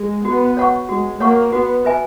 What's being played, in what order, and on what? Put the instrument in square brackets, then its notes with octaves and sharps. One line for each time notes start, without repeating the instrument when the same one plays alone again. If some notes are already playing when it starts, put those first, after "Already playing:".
Already playing: [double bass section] G#3
[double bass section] B3 [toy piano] F#4
[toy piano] C#5 F#5 C#6
[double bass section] G#3 [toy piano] F#4
[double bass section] A#3 [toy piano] C#5 F#5 C#6
[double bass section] B3 [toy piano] F#4
[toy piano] B4 E5 G#5